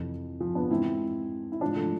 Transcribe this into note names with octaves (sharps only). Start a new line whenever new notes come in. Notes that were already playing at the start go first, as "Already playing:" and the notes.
Already playing: F2 C3 E3
F3
B3 D4
G#2 E3 C4 E4
E4
G#2 E3 D4 F4
F3 A3